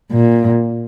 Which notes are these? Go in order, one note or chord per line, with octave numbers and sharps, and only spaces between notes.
A#2